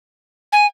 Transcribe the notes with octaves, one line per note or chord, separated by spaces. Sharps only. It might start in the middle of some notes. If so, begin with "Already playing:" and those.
G#5